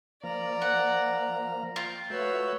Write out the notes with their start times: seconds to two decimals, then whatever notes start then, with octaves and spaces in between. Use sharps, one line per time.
0.23 F3 A#3 D5 A#5
0.62 F#5
1.76 F4 G5
2.10 A3 F#4 B4 C#5 E6 G6